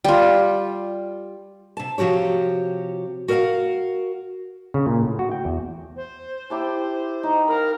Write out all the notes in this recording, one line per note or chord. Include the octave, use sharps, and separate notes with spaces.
G3 F4
C3 A5
C3 F3 F#4 G4 C#5
F#4 A#4 C5 D#5 F5 F#5
C#3
A#2
A2
F#4
G5
E2
C5
E4 G4 A5
D#4
A#4 F5 B5